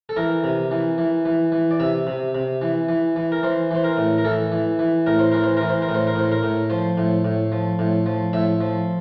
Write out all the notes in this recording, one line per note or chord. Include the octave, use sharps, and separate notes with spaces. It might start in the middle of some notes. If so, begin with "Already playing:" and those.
A4
E3 A#4
C3
E3
E3
E3
E3
D5
C3 E5
C3
C3
E3
E3
E3
A#4
E3 C5
E3 C5
A#4
A2
A#4
E3 A4
E3
E3
A2 A#4
C5
E3 A#4
C5
E3 A#4
C5
A#4
A2
C5
A#4
A2 C5
A#4
A2
F3 C5
A2
A2
F3
A2
F3
A2 E5
F3